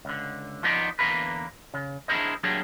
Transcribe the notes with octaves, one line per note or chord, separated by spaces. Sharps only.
C#2 D3
F3 B3 D#4 D5
E2 A#2 D3 A#3 A#4 B4
C#3
D4 E4 G#4 A#4 C5 D#5
F#3 G3 A#3 D4 G#4